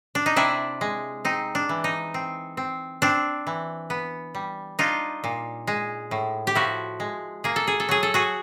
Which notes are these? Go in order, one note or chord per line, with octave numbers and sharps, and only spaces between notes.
D4
D#4
C3 D4 E4
G#3
C4 D#4
D4
E3
D#4
C4
C4
C4 D4
E3
B3
G3
D4 D#4 F4
A#2
G#3
A2
G4
F3 E4 F#4
G#3
A#3 G#4
A4
G#4
A4
F#3 G#4
A4
F#4 G#4